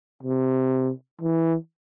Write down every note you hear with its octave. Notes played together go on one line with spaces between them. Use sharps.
C3
E3